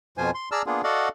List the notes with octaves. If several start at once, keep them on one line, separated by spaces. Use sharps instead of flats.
F2 B2 F3 F4 C5 G#5
C6
G#4 D5 A5 A#5 E6 F6
A#3 B3 D4 F4 G#4
F#4 A4 D5 D#5 F5 F#5